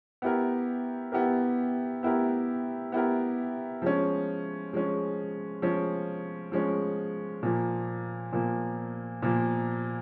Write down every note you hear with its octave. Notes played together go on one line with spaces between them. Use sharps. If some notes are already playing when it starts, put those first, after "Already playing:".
B3 E4 G4 A#4
B3 E4 G4 A#4
B3 E4 G4 A#4
B3 E4 G4 A#4
F3 G#3 C#4
F3 G#3 C#4
F3 G#3 C#4
F3 G#3 C#4
A#2 F3 A#3
A#2 F3 A#3
A#2 F3 A#3